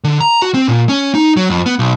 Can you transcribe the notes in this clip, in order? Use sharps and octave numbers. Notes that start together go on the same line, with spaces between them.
D3
A#5
F#4
C4
A#2
C#4
D#4
F#3
F2
B3
B1